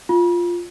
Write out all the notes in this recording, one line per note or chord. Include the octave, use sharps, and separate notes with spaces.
F4